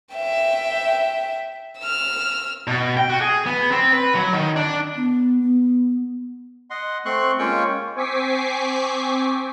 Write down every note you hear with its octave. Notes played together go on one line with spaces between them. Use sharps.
E5 G5
E6 F6
B2
G5
F#4
G#4
B3
C4
B4
F#3
D#3
D4
B3
B3
D#5 F#5 C6
A3 C4 C6 C#6 F#6
G#3 A#3 C#4 F4 G5 C#6
C4 G#5 C#6 D6 B6 C7